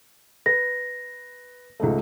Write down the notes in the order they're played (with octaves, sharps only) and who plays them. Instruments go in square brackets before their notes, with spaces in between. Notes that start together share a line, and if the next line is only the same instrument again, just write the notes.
[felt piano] B4 [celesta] A#6
[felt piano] C#2 G#2 A3